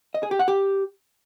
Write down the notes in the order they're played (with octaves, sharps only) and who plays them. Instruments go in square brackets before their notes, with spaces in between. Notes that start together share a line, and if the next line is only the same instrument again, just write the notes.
[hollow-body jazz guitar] D#5
G#4
G4
F#5
G4